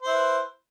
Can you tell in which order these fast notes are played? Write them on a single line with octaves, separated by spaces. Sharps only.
C5 E4 B4